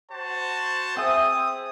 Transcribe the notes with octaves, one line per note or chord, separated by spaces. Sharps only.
F#4 C5 A5
C4 G#4 E5 D#6